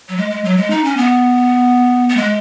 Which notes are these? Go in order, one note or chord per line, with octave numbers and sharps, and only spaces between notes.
F#3
G#3
G#3
F#3
G#3
D#4
C#4
B3
B3
G#3